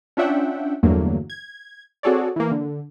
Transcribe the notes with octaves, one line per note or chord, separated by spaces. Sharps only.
C#4 D4 F4 E5 F#5 G5
E2 G2 D3 F#3 A3 A#3
G#6
C4 F#4 G#4 A4 C#5 D5
E3 A#3
D3